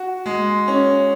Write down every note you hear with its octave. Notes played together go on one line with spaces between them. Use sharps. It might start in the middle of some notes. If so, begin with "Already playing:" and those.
Already playing: F#4
G#3
C#4